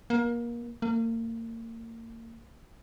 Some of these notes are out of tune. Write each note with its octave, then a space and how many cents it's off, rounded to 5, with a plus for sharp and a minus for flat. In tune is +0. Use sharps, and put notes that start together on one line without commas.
A#3 +25
A#3 -35